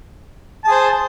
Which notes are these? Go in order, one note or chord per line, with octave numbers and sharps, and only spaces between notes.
G#4 C5 A5